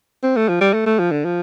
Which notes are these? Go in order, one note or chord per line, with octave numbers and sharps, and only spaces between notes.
C4
A3
F3
G3
A3
A3
F3
D3
F3